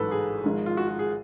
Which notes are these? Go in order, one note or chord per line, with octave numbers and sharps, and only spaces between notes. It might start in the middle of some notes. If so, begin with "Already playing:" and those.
Already playing: A1 G#2 F#3 A4 B4
G#4
G#1 G#2 F3 G#3
F4
F#4
F#4
G#4